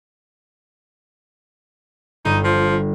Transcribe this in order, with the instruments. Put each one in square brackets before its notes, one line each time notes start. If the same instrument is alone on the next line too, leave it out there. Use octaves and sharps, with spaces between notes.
[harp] G1 [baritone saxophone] D#4
[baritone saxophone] F3